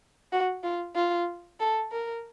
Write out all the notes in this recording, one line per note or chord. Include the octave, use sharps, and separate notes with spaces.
F#4
F4
F4
A4
A#4